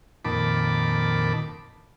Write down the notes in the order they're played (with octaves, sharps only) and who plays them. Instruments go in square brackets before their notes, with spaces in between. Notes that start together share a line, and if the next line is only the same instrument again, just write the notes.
[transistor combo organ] F2 A#2 D#3 A5 B5 D6